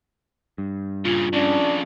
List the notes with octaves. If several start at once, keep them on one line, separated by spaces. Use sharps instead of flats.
G2
A#2 C#3 F4
F2 C#3 C#4 D4